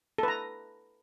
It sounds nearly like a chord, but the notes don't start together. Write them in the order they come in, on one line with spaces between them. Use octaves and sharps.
A4 B4 A#5